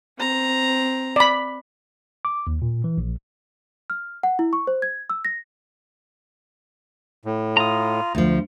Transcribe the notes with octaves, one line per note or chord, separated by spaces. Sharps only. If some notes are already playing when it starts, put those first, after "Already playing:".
C4 A#5
D5 B5
D6
D#2
A#2
E3
A#1
F6
F#5
E4
C#6
C5
G#6
E6
A#6
A2
F4 A#5 D#6
D2 F3